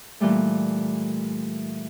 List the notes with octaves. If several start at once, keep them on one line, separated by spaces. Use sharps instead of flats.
A#2 E3 G3 A3